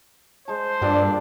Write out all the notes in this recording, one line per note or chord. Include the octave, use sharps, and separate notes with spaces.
G#3 C5 A5
G2 A#2 G3 D4 G4